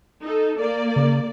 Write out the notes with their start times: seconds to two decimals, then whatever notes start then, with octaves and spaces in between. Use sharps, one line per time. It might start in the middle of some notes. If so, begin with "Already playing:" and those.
0.22 D#4 A4
0.58 A#3 D5
0.96 C#3